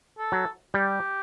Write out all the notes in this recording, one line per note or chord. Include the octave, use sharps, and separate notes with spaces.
A4
F#3
G3 G4